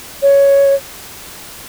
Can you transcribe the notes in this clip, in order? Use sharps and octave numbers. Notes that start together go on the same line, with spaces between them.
C#5